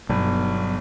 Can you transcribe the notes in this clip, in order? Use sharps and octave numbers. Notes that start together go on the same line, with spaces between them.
G1 B2 F#3